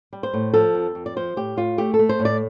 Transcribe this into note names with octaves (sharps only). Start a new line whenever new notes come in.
G3
C5
A2
F3 A4
F2
F2
D5
F3 C5
A2 G4
A2 F4
A3 G4
A4
A3
C5
A2
D5